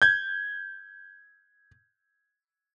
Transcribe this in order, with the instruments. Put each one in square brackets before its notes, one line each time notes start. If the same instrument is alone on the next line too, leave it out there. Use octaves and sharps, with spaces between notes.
[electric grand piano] G6 G#6